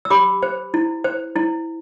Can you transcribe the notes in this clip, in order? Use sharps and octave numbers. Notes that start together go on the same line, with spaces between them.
E6
G4 B5 D6
C5
E4
C5
E4